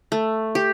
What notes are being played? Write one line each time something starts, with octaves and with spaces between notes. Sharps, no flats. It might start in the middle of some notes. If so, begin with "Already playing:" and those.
A3
G4